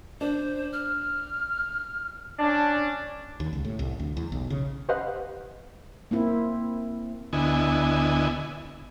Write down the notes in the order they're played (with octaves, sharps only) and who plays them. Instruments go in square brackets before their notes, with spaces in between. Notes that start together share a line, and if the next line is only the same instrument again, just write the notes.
[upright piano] D4 [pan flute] C5
[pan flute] F6
[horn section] C#4 D4
[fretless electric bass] D#2
C#2
A2
C2
D2
E2
B1
C#3
[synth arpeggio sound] G4 B4 C5 D#5 F5 F#5
[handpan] A#3 C4 E4
[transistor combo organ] D2 D3 B3 E4 D#5 G#5